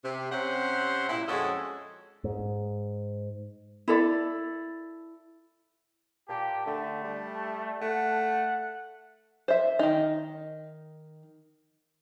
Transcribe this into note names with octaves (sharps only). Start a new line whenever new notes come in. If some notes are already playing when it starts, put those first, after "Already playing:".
C3
C3 C4 C#4 C5 F#5
A#2 E4
F2 G#3 C#4 F#4 A4 D#5
G#2
E4 A4 D5
A#2 G4 A5
D3 A3
G3
A5
A3 F#5
C5 E5
D#3 D#4